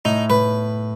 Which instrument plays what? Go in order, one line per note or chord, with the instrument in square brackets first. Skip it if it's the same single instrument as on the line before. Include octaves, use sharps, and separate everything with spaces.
[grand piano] A2 [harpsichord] D#4
[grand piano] A2 [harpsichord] B4